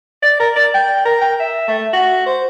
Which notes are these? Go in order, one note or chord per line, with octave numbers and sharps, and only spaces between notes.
D5
A#4
D5
G5
A#4
G5
E5
A3
F#4
C5